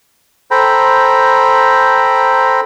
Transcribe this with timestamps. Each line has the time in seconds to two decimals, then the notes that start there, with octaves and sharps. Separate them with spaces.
0.51 A4 C5 G5 A#5 B5